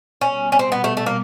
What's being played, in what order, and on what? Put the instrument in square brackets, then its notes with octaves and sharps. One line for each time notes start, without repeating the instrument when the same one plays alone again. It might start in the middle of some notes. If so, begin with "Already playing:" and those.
[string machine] B2 G3 B3 [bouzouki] C#4
[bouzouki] C#4
C4
B3
A3
A3
A#3